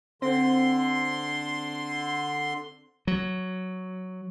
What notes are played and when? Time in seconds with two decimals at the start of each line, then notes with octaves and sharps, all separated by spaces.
0.22 D3 C4 C6
3.07 F#3